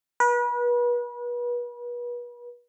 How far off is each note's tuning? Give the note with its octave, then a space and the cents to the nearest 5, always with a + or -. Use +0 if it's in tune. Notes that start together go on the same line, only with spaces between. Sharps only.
B4 -35